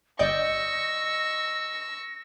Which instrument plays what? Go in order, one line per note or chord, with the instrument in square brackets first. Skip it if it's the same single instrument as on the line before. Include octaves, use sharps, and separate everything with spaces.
[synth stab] G1 D5 G6 [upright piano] D#5 [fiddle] C#6 E6 [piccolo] A#6